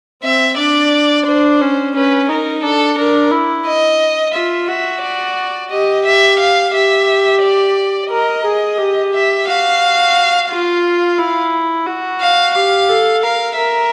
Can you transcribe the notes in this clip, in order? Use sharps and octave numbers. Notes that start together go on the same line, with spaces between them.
C4 E5
D4 D5
D4 C5
C#4
C#4 B4
D#4 A#4
D4 A4
D4 A#4
E4
D#5
F4 E5
F#4 E5
D5
G4 D#5
E5
F5
G4 E5
D5
A#4 D#5
G#4
G4
E5
F#4 F5
F4 F5
E4
F#4
F5
G4 F5
A4
A#4 F5
A#4 E5